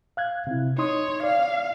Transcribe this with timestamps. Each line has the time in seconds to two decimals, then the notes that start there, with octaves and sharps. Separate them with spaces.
0.17 F5 F#6 G#6
0.47 C3 E4
0.78 D#4 C#5 C6 D#6
1.24 D5 F5